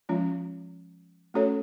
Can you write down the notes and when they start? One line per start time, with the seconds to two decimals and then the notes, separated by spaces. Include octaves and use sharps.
0.09 F3 G#3 C#4 F4
1.34 A3 C#4 F#4 A4 C#5